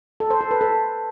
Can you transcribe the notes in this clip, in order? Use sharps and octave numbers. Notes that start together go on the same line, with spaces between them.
A4
C5
A4
B4
A4